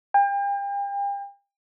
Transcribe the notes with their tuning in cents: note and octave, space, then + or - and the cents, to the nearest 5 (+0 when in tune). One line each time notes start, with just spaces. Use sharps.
G5 +40